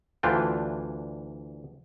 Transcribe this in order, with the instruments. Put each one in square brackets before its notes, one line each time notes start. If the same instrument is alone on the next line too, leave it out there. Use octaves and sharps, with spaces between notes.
[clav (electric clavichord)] D2 E3 D4 F4 G5